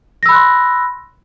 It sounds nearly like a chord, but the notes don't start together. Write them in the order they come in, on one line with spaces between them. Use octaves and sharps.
A#6 E6 B5 F#6 C6